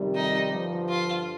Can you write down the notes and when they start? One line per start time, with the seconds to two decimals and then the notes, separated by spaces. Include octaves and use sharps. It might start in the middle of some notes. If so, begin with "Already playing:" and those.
Already playing: F2 C3 D#3 G3
0.15 D#4
0.52 G2 D3 F3
0.89 F4